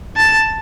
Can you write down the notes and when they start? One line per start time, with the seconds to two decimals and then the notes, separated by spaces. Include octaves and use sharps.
0.17 A5